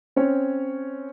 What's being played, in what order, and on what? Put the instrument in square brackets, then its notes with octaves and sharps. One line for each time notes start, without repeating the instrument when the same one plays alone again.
[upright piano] C4 C#4 C#5